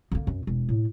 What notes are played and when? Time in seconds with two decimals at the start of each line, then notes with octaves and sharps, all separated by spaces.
0.12 D3 A#3
0.27 F#2
0.47 E1
0.69 A2